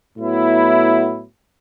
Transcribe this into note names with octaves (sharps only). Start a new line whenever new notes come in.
A2 F#3 B3 E4